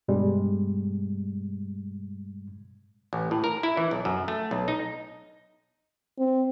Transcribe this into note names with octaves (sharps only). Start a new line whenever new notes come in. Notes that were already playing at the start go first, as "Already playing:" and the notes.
G2 B2 G3 G#3
A1
A2
A#4
E4
E3
B1
F#2
A3
B1
D#4
C4